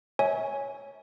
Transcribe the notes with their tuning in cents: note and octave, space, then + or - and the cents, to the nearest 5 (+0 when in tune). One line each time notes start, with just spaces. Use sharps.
C#5 +0 E5 -35 G#5 +0